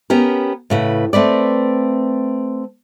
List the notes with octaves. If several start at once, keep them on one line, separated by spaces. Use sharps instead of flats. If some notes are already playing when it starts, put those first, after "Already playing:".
B3 C#4 G4 A#4
A2 C#3 B4
A3 C4 B4 D5